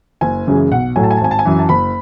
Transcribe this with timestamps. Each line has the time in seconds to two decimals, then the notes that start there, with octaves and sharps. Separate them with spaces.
0.21 F#1 G#5
0.47 F#2 C#3 E3 G#3
0.71 B1 F#5
0.96 A2 F#3 A3 G#5
1.03 A5
1.11 G#5
1.17 A5
1.21 G#1 G#5
1.31 A5
1.39 G#5
1.45 F#2 E3
1.59 A5
1.69 F#1 B5